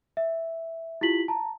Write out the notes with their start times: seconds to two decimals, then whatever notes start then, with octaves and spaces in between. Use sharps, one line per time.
0.17 E5
1.01 E4 F4 G4 B6 F#7
1.28 A5 A#5